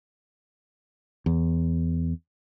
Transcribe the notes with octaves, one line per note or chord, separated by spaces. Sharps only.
E2